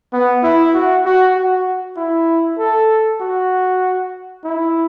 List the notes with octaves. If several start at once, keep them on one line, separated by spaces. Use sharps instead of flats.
B3
E4
F#4
F#4
F#4
E4
A4
F#4
E4